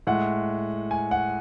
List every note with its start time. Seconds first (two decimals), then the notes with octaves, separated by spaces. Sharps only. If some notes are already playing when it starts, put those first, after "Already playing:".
0.07 A2 G#3 F#5
0.91 G#5
1.11 F#5